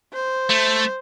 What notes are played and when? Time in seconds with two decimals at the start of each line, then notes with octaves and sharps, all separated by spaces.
0.13 C5
0.49 A3